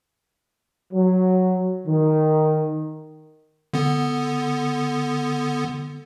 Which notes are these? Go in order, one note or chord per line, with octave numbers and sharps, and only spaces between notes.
F#3
D#3
D3 B3